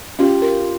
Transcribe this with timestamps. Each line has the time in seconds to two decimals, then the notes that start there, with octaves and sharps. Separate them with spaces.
0.19 C#4 F4 G4
0.42 A#4